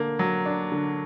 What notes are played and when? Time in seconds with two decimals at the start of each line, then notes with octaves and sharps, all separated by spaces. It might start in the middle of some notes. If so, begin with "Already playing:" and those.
Already playing: D3 A#3
0.19 F#3
0.45 D4
0.72 D3